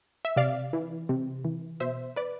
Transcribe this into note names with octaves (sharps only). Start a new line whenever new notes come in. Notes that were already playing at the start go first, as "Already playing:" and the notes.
E5
C3 D5 F5
E3
C3
E3
B2 C5 E5
B4 D5